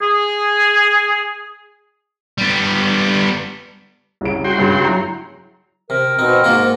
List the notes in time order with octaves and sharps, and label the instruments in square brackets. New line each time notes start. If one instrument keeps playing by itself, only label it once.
[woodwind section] G#4
[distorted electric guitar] G3 B3
[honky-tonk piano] C2 C#3 D7
[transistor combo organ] F#4 G5 C6
[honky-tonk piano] G2 C#3 G#4
F#3 E4 A#5
[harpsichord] C3 [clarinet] A#4
[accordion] B2 C4 [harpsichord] D#4
[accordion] G#2 [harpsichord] A#3 F4 F#4